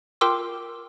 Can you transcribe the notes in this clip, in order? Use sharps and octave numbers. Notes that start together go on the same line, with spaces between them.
F4 A#4 G5 C6 D6 E6